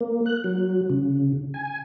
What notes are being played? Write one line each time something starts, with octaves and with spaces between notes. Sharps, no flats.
A#3
F#6
F#3
C#3
G#5